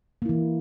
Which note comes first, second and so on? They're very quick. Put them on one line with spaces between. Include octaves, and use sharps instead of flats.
A#3 E4 E3